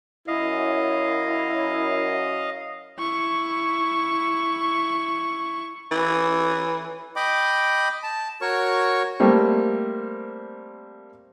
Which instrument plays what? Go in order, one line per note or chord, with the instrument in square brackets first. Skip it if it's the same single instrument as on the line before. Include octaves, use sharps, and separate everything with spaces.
[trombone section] F#2 [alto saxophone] E4 [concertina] D#5 F5
[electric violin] E4 C#6
[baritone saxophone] E3
[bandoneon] D#5 G5 B5 D6
A5
F#4 A#4 C#5 C#6
[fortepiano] G3 A3 A#3 C4